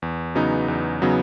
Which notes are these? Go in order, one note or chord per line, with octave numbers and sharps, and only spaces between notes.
E2
C#3 F#3 B3 D#4
E2
C#3 F#3 B3 D#4